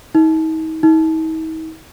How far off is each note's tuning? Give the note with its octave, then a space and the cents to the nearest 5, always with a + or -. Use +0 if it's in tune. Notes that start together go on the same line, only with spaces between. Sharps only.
D#4 +40
D#4 +45